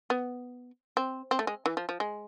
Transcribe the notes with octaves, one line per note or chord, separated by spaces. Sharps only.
B3
C4
C4
A3
G#3
E3
F3
F3
G#3